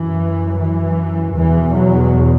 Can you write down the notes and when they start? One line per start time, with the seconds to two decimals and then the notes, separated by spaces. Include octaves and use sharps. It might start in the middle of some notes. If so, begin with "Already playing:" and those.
Already playing: F#2 E3
0.58 E3
1.35 E2 B2 E3
1.73 F#3